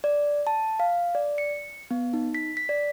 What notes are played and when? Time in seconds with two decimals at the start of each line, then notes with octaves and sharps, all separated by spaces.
0.04 D5
0.47 A5
0.80 F5
1.15 D5
1.38 C#7
1.91 B3
2.13 D#4
2.35 B6
2.57 B6
2.69 D5